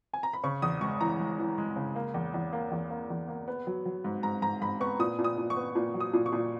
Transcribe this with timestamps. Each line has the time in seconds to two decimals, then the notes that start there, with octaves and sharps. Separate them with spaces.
0.13 G#5
0.23 A#5
0.33 B5
0.44 C#3 C#6
0.62 E2 D#6
0.81 G#3 C#6
1.00 E3 A#5
1.19 G#3
1.38 E3
1.58 G#3
1.76 C#3
1.96 A#3
2.14 E2
2.34 E2
2.53 A#3
2.71 E2
2.90 A#3
3.10 E2
3.28 A#3
3.48 B3
3.67 F#3
3.86 F#3
4.04 G#2
4.23 G#2 A#5
4.42 G#2 A#5
4.62 G#2 B5
4.80 B3 C#6
4.99 A#2 D#6
5.19 A#2
5.24 D#6
5.38 A#2
5.50 C#6
5.56 B3
5.75 A#2
5.94 F#3
6.00 D#6
6.13 A#2
6.26 C#6
6.32 A#2